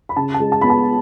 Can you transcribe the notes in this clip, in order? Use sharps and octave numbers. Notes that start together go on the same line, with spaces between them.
B5
C#3 A5
A5
G#3
A5
B3 B5
A5